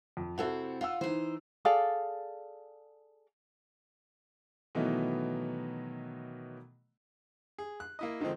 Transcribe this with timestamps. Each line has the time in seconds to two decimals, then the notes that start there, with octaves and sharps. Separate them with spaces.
0.17 F2
0.38 C3 C4 E4 F#4 A4 F#5
0.81 F4 F5 F#5 E6
1.01 E3 D#4 C5
1.65 G#4 A4 D5 F5
4.75 B2 D#3 E3 F#3 A3 B3
7.58 G#4
7.80 F#6
7.99 A#3 E4 D#5
8.20 D3 D#3 F3 G#3 C4